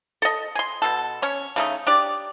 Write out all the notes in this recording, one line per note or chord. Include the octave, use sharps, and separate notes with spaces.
A4 D#5
G#5 C6
B2 A4
C#4 C#5
C#3 A3 D#4
D4 G4 D5